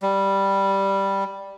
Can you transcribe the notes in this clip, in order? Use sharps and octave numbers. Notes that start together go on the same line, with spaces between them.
G3